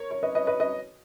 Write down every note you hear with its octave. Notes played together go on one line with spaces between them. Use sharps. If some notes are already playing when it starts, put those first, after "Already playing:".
Already playing: A#4 C#5
C#5
B4 D#5
B4 D#5
B4 D#5
B4 D#5